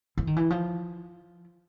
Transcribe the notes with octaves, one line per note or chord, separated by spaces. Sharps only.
E3
D#3
E3
F3